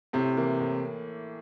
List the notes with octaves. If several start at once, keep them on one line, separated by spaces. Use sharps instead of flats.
A2 C3
E3 A#3
A2